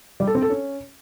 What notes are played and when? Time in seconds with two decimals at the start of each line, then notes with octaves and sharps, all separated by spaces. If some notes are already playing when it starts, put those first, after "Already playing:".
0.20 G3
0.27 A4
0.35 C4
0.42 A4
0.50 C#4